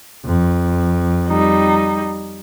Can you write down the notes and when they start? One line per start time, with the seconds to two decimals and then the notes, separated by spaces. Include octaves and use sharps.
0.25 F2
1.28 G3 D#4